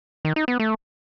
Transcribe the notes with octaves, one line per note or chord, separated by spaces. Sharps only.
D#3
D#4
B3
A3